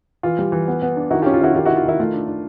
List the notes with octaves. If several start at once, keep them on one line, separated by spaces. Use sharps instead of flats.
E3 F4
G3
E3
B3
B3
D4
D#3 E4 F#4
F4 G4
C#4
F4
D#3 E4 F#4
D#3 F4 G4
E4 F#4
D#3
F4
D#3 E4
A3 F4
D4
D4